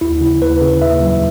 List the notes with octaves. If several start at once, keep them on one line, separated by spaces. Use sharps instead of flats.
D#2 E4
C#3
D#2 B4
C#3
D#2 E5
F#3